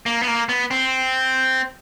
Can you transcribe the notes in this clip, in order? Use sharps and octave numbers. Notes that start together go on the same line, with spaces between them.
A#3
B3
A#3
B3
C4